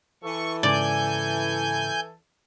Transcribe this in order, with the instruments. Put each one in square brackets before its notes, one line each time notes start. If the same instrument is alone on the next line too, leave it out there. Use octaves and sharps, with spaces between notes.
[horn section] E3 A4 [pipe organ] C#6
[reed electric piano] G#2 C#3 [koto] D5 [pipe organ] G#5 G6